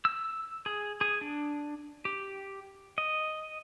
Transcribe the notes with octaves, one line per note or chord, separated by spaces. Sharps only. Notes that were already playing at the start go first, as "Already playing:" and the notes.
E6
G#4
G#4
D4
G4
D#5